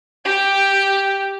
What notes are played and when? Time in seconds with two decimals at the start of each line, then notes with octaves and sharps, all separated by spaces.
0.25 G4 G5